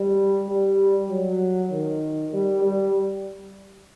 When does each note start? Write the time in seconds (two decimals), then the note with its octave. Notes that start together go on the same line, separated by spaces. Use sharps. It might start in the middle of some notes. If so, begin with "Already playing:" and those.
Already playing: G3
0.49 G3
1.10 F#3
1.71 D#3
2.33 G3
2.63 G3